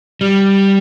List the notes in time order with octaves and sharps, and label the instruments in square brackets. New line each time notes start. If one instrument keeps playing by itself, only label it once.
[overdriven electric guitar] G3